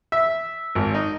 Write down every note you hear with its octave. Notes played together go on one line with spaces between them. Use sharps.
E5
G#1
D#4